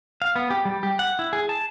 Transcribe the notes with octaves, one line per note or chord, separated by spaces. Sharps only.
F5
B3
G4
G3
G4
F#5
E4
G#4
A5